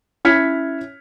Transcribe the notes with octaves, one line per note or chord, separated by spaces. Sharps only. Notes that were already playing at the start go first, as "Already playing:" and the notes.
C#4 E4 F6 G#6 B6 C#7